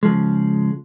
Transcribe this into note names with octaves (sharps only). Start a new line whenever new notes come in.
C#3 F3 G#3